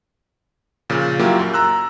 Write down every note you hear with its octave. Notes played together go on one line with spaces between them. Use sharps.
A#2 C#3 F3
A#2 F#3 A#3 E4 F4 G4
F#2
A#5 E6 F#6